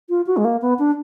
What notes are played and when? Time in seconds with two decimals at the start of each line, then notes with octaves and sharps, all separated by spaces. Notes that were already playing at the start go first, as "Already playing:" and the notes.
0.09 F4
0.27 F#4
0.37 G#3
0.45 A#3
0.62 B3
0.79 D4